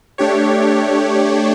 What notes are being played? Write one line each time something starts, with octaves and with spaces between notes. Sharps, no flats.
A3 D4 G4 C#5